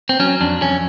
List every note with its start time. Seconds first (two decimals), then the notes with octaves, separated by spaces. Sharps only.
0.09 C4
0.20 F#3 C#4
0.41 F2 D4
0.61 F2 C#4